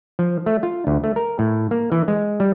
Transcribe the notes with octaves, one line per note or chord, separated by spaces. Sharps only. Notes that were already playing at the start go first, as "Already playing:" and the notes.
F3
A3
F4
D2
A3
A#4
A2
A#3
E3
G#3
G3